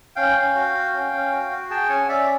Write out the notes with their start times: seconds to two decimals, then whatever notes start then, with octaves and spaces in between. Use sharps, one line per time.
0.16 C#4 F5 G5
0.36 C#4
0.55 F#4
0.74 F#4
0.93 C#4
1.12 C#4
1.32 F#4
1.51 F#4
1.70 G#4 G5 A5
1.89 C#4 F#5 G#5
2.08 C#4 D5 E5